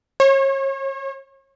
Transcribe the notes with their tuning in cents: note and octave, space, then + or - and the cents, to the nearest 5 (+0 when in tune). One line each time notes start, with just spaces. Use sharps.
C#5 -35